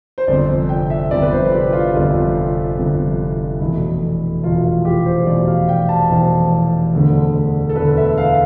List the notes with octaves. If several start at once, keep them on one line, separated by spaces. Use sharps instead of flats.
C5
G1 F2 C3 D5
G5
E5
G1 F2 C3 D5
B4
C5
G4
F4
G1 F2 C3
G1 F2 C3
F1 E2 B2 E4
F1 E2 B2 F4
F4
G4
C5
F1 E2 B2 D5
F5
G5
A5
F1 E2 B2 C5
E1 D2 D3
A4
E1 D2 D3 B4
E5
F5